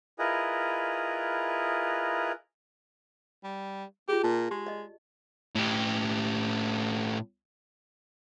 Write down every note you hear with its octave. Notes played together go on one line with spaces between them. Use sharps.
E4 F4 G#4 A#4 B4 D#5
G3
F4 G4 G#4
A#2 A5
G#3 G4
D5 D#5
A2 G4